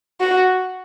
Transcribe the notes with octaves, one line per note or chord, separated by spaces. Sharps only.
F#4